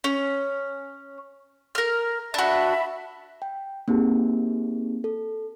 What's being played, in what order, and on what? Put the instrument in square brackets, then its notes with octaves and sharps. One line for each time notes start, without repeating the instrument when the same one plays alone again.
[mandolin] C#4
A#4 F6
[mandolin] D4 F#4 [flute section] E5 B5
[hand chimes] G5
A#3 C4 D#4 G4 G#4
A4